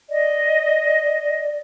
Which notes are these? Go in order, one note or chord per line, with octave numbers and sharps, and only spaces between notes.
D5 D#5